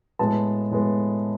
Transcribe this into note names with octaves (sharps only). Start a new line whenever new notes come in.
A2 G#3 B3 A5
A2 G#3 B3